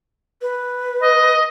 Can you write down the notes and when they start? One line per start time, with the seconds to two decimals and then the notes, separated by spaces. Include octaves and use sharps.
0.42 B4
1.01 D#5